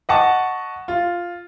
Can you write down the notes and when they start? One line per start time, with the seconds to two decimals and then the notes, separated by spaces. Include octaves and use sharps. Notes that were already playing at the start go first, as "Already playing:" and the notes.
0.09 D#5 F#5 A5 C#6
0.88 F4